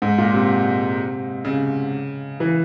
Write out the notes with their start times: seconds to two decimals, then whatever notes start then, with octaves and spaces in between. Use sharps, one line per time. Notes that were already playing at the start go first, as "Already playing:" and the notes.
0.02 G#2
0.18 A#2
0.34 C3
1.45 C#3
2.40 E3